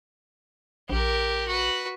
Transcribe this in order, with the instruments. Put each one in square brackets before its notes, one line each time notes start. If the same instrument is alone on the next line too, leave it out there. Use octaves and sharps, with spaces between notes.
[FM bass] A#1 [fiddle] G4 A#4
[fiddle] F#4 B4